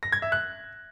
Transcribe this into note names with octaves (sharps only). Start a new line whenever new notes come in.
A#6
G#6
E5
F#6